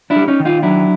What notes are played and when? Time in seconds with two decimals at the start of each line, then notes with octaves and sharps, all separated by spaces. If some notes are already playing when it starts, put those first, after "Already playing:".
0.10 D4 E4
0.16 G3
0.28 C#4 D#4
0.40 D#3
0.45 D#4 F4
0.62 F#3 D4 E4